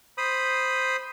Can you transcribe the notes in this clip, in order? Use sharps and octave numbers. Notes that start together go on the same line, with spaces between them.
C5 B5 D#6